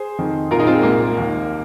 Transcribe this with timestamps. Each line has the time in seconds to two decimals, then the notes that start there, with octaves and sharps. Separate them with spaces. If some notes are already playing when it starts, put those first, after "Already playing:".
Already playing: G#4 C5
0.19 F2 D#3
0.51 C2 A#2 F4 A#4
0.59 D#4 G#4
0.67 C4 F4
0.75 G#3
0.83 C2 A#2 A#3
1.16 D#2 D#3